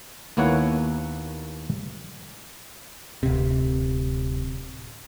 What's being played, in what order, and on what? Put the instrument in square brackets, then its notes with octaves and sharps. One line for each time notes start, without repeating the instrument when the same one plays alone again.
[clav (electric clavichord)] D#2 A#3 B3 E4 C#5 F#5
[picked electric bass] D1 C3